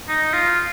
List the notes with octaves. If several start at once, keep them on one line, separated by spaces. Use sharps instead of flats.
D#4
F4